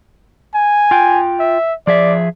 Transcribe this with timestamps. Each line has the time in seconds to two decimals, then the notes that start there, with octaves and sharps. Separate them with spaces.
0.54 G#5
0.91 F4 G5
1.40 E5
1.87 F3 G#4 D5 E5